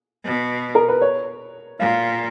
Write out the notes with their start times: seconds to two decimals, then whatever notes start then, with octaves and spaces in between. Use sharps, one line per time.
0.24 B2
0.75 A#4
0.88 B4
1.01 C#5
1.79 A#2 F5